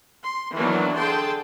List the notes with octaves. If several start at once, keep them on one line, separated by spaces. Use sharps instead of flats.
C6
D#3 E3 F#3 A#3 B3 D4
D3 G#4 G5 A5 C6